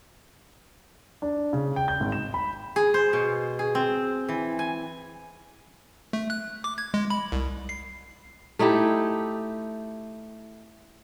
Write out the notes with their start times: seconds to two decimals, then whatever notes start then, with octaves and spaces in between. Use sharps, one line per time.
1.22 D4
1.53 C#3
1.76 G5
1.88 G6
2.00 G#1
2.12 E7
2.34 B5
2.76 G#4
2.94 C5
3.13 B2
3.59 G#4
3.75 C4
4.29 E3
4.59 G#5
6.13 A3
6.30 F#6
6.64 D6
6.78 G#6
6.94 G#3
7.10 B5
7.32 C2
7.69 C7
8.59 A3 D#4 E4 G4